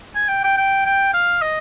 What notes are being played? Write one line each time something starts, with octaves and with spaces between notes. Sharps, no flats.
G#5
G5
G5
G5
G5
F5
D#5